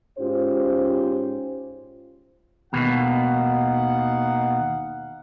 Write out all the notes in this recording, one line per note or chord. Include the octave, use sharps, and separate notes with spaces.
G#2 C#4 F4 G4 C5
D#2 B2 D#4 F5 F#5